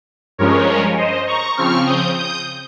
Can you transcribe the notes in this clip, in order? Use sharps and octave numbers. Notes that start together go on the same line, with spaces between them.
G2 F3 G#3 C#4 A#4 C#5
C5 D#5
A#5 C#6
C#3 F3 C4 C#6 F6
D#6 G6
D#6 G6